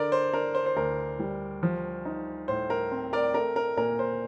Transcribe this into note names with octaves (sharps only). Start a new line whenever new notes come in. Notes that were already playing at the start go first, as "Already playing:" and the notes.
Already playing: D3 A#4 D5
C5
D4 A#4
C5
C5
D2 A#4
G3
F3
D#4
A2 C5
A#4
C4
A#4 D5
A3 A#4
A#4
A#2 A#4
C5